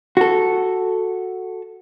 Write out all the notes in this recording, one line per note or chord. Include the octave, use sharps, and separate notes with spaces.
F#4 A4